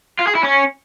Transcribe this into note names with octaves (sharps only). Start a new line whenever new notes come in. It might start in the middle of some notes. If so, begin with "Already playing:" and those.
F4
G#4
E4
C#4